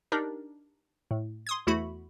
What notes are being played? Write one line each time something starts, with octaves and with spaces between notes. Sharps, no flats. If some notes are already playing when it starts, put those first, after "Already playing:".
D4 D#4 G4 A#4
A2
C6 D#6 G#6
E2 A3 E4 F#4 B5